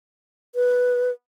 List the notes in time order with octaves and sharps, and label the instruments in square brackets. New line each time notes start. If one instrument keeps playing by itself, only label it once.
[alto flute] B4